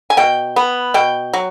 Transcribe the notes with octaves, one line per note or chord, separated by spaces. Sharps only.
G#5
B2 G5
B3
B2 G5
F#3